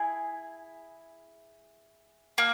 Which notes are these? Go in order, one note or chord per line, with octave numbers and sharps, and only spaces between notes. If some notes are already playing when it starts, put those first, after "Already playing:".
Already playing: E4 G#4
A#3